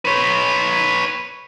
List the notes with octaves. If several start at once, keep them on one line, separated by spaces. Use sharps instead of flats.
B4 C#5